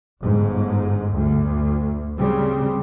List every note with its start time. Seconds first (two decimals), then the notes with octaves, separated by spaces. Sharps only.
0.22 G1 G#2
1.15 D2
2.18 C#3 G3 C4